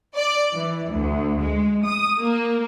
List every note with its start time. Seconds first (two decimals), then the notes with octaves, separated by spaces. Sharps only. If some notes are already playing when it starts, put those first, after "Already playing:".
0.15 D5
0.54 E3
0.92 D2
1.42 G#3
1.85 D#6
2.20 A#3